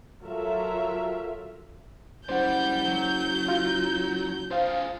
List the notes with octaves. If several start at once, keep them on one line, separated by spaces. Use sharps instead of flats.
F#3 F4 A4 A#4 E5
F#1 G3 C5 D5 F#5 G6
F#3
F4
F4 G#4 C5 F5